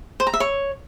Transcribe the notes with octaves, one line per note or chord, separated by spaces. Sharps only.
C5
A#5
E5
C#5